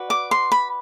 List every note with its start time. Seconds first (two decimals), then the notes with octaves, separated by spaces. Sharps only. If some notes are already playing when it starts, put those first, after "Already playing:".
Already playing: F#4 B4 D5
0.10 D6
0.31 C6
0.52 B5